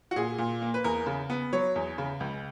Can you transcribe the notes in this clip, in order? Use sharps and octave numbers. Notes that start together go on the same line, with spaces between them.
F#4
A#2 G#4
A#2
A#3
B4
E2 A#4
C#3
B3
F#3 C#5
E2
C#3
C#2